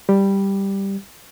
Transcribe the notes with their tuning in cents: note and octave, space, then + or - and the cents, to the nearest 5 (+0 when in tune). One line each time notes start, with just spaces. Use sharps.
G3 +0 G4 +0